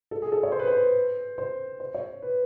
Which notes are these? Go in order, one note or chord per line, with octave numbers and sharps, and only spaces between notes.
A4
G#4
A4
C#5
C5
B4
C5
C5
C5
C#5
B4